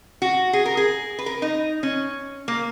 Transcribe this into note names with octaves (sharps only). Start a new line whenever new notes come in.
F#4
G#4
A#4
G#4
B4
A#4
D#4
C#4
A#3